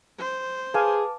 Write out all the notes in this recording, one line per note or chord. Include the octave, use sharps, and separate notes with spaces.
C5
G#4 B4 F5 G#5 A5 D6